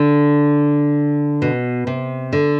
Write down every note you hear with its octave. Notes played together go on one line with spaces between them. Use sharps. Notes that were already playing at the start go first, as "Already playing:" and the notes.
Already playing: D3
B2
C3
D3